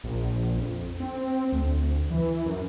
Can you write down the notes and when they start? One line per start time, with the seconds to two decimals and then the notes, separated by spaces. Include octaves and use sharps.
0.04 A#1
0.57 F2
1.00 C4
1.52 D2
2.11 E3
2.46 F#2